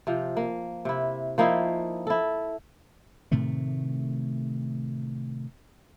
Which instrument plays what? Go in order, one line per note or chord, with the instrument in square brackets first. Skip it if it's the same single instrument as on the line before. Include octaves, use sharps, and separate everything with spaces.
[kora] C3 F3
A#3
C3 E4
F3 A#3 D#4 E4
E4 A4
[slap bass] A2 C3 D#3 A3